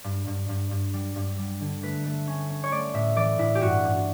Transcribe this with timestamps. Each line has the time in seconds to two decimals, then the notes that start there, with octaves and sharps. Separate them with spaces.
0.04 G2
0.27 G2
0.49 G2
0.71 G2
0.94 G3
1.16 G2
1.38 G3
1.60 D3
1.82 A3 B4
2.05 A3
2.27 C#4
2.49 C#4
2.64 C#5
2.72 A3 D5
2.94 A2 E5
3.16 E3 D5
3.38 A2 E4
3.55 G4
3.61 G2 F#4
3.83 G2